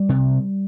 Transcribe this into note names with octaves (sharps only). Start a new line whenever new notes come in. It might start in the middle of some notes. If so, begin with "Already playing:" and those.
Already playing: G3
C3